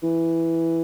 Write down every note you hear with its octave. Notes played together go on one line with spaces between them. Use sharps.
E3